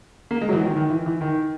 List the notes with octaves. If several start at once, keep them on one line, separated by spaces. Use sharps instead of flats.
A#3
G#3
F#3
E3
D#3
D#3
E3
E3
D#3